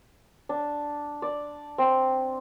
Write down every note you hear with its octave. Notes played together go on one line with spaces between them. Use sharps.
D4
D5
C4